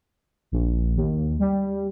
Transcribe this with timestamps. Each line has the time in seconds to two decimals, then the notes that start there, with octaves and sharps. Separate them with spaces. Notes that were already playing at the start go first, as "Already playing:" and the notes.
0.52 A#1
0.96 D#2
1.39 G3